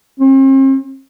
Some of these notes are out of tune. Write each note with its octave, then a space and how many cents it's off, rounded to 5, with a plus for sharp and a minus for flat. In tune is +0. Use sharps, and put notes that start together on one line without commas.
C4 +45